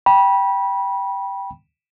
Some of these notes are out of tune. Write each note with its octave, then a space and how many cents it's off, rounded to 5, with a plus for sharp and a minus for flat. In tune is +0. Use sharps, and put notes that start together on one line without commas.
G5 +0 B5 -25